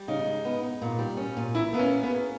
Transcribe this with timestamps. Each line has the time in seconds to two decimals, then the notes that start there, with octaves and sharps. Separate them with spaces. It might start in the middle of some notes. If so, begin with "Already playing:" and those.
Already playing: G3
0.08 C#3 D#4
0.25 G#3
0.45 B3
0.63 D#4
0.82 A#2
0.99 G3
1.17 C#4
1.37 A#2
1.55 E3 E4
1.73 A#3 B3
1.79 C#4
1.91 C#4
2.03 B3
2.10 G#4